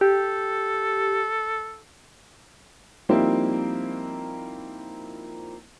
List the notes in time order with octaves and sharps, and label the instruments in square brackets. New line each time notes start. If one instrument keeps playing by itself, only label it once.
[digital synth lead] G4 [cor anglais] A4
[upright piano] F3 G3 A#3 C4 D#4 E4